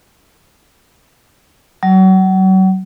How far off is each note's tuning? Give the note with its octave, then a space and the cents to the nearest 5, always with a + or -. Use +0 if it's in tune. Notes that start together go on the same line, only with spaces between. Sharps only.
F#3 +35